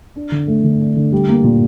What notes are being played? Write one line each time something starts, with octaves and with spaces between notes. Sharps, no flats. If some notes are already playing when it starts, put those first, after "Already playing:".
D4
D3
A3
D3
D4
D3
G3
A#3
A#2